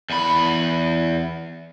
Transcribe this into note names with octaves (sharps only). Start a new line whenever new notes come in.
E2 B5